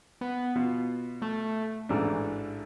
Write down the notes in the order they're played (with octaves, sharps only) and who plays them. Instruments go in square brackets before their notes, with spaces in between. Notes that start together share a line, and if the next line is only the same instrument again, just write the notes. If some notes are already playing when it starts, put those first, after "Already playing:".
[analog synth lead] B3
[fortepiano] B2 B3 F4
[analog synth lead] A3
[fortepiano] A1 G#2 E3 A3 D4